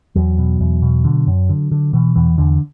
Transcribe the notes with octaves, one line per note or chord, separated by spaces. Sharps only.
E2 F#3
B2
E2
B2
D3
F#2
D3
D3
B2 E3
E2 E3
E2 D3